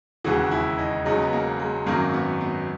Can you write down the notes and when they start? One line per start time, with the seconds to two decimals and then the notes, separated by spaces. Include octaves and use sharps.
0.24 E1 D#2 C#3 E3 F#4
0.51 E4
0.78 D#4
1.05 E1 E2 C#3 F#3 D#4
1.22 B3
1.33 A#3
1.59 G#3
1.86 G#1 F#2 D#3 F#3 A#3
2.14 B3
2.41 B3